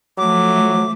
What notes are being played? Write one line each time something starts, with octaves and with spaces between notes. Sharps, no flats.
F3 F#3 A3 D6